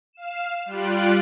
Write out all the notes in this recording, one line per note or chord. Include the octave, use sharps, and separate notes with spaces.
F5 E7
G3 F4 F#6 D7